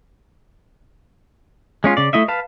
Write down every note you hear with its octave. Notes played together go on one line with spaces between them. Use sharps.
G#3 C#4 F4
C#3 D5
A3 E4 D#5 E5
B4 F5 A5